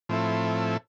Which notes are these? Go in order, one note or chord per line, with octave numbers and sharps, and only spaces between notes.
A2 F3 C4 E4 A4